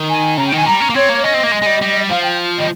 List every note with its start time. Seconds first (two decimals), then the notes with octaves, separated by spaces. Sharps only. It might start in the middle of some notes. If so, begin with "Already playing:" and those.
Already playing: D#3
0.09 G#5
0.37 C#3 A#5
0.47 G5
0.52 D#3 G#5
0.66 G3 A#5
0.81 C#4
0.90 A#3
0.94 C4 C#5
1.09 A#3
1.24 C#4 D#5
1.34 C4
1.43 A#3
1.52 G#3
1.62 G#3
1.66 G3
1.81 G3
2.09 F3 F5
2.23 G5
2.58 G3 D#5